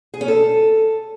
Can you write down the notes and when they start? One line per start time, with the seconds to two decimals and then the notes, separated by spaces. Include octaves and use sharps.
0.14 G#4
0.21 C#4
0.28 A4